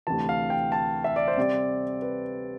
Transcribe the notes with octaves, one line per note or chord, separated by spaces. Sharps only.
D2 C3 E3 A5
F5
G5
A5
E5
D5
C5
C3 G3 C4 D5
B4